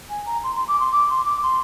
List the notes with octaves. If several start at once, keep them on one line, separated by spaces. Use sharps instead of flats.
G#5
A#5
C6
C6
D6
C6
D6
C6
D6
C6